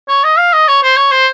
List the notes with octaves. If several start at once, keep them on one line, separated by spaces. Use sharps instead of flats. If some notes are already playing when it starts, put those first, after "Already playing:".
C#5
D#5
F5
D#5
C#5
C5
C#5
C5